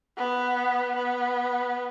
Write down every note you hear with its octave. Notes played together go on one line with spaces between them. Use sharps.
B3
B3